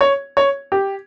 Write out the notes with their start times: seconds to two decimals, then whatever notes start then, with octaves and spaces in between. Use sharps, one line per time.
0.01 C#5
0.37 C#5
0.72 G4